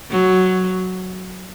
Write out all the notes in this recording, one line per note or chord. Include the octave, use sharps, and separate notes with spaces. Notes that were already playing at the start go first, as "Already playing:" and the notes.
F#3